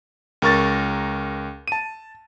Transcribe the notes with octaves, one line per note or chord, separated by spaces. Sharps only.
C#2 A#4 C#6 A6
A5 D#7